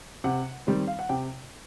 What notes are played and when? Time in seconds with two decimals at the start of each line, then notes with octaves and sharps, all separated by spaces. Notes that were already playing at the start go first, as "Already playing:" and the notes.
0.24 C3 F#5
0.67 D#3 G3 C4
0.87 F5
0.99 F#5
1.09 C3 G5